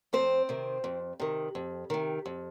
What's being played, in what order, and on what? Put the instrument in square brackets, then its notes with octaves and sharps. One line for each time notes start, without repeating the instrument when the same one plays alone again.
[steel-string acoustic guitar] F2 C4 C5
C3 D#3
F2
C3 D#3
F2
C3 D#3
F2